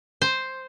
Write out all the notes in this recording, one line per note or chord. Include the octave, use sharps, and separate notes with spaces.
C5